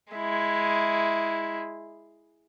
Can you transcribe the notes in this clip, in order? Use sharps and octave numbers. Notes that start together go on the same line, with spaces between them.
G#3 E4